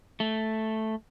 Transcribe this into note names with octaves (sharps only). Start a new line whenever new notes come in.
A3